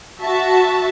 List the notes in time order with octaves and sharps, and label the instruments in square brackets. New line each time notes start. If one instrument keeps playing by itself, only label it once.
[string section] F#4 E5 A5